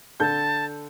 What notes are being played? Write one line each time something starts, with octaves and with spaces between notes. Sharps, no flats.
D3 A4 A5 G6